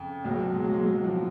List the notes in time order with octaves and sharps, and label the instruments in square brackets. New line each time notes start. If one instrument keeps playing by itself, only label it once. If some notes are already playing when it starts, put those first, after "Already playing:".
Already playing: [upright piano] F2 C#3
C#2 F#3
B2
G#3
F#3
G#3
F#3
F3